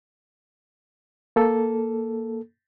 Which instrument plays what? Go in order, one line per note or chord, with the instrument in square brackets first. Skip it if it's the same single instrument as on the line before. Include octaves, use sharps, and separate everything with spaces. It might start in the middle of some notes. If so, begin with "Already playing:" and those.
[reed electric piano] A#3 A4